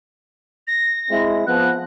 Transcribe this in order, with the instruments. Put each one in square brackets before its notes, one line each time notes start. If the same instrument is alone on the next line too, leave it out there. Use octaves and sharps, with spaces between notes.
[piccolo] A#6
[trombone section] G#3 C4 E4
[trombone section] F3 B3 [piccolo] F#6